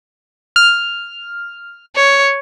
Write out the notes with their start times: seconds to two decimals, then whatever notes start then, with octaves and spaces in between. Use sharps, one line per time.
0.56 F6
1.96 C#5